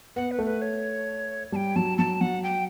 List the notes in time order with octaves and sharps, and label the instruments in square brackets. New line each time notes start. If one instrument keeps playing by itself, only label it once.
[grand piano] B3 [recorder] F#5
[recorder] B4
[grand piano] A3
[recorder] B4
C#5
[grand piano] G3 [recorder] A5
[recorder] G5
[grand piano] F#3 [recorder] A5
[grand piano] F#3 [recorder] A5
[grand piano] F#3 [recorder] F#5
[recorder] G5